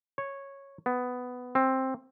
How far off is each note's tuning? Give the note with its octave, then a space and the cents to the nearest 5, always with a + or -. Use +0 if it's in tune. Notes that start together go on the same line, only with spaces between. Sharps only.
C#5 -10
B3 +10
C4 +10